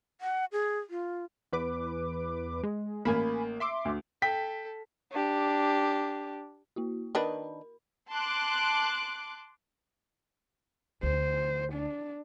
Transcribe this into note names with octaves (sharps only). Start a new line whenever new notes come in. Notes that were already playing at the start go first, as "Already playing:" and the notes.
F#5
G#4
F4
E2 B4 D6
G#3
A1 A#3 G#5 B5
E5 C6 D6
D2
A4 G5 B6
D4 G4
A#3 E4 F#4
D#3 D4 A#4 B4 B5
A5 C6 D6 F#6
D2 C5
D4